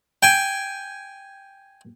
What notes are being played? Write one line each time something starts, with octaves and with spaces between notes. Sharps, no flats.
G5 G#5